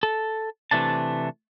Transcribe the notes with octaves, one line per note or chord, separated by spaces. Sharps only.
A4
C3 E3 A3 D4 A5